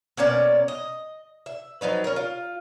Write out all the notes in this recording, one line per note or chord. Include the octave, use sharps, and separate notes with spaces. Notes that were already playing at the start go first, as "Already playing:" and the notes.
B2 A#3 C#4 D5
D#5
E5
F3 F#3 D#4 B4
C#4 A#4
F4